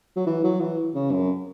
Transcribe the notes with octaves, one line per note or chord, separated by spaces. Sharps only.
F#3
E3
F#3
E3
C#3
F#2